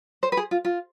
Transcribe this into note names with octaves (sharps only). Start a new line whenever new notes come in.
C5
B4
G#4
F4
F4